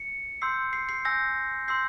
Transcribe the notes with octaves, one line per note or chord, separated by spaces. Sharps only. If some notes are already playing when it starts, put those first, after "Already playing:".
Already playing: C#7
C6 E6 G6 C7
C7
C7
G#5 E6 G6 A#6
C6 E6 G6 C7